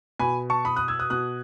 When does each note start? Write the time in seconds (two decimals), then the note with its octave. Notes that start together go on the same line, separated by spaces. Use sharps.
0.19 B2 G#5 B5
0.50 A5 C#6
0.65 B5 D#6
0.76 D#6 F#6
0.88 E6 G#6
0.99 D#6 F#6
1.10 B2 D#6 F#6